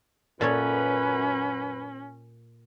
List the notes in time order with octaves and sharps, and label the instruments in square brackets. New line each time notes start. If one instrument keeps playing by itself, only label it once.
[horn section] F#2 B4 [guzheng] A#2 A4 C#5 [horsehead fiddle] C#4